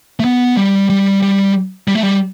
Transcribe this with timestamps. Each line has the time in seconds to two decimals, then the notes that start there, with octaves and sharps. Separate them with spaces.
0.20 A3
0.24 B3
0.57 G3
0.90 G3
1.22 G3
1.88 G3
1.95 A3
2.03 G3